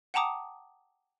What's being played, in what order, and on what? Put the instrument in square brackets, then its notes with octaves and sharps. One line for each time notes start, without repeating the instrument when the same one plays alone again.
[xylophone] F#5 G5 A5 A#5 D6 D#6